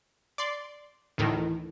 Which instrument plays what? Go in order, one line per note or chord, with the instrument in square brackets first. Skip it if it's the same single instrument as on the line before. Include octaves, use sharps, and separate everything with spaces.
[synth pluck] D5 C6
[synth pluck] D2 A2 D#3 [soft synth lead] E3